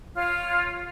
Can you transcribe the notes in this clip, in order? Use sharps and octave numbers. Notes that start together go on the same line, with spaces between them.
F4 C#5 F5 F6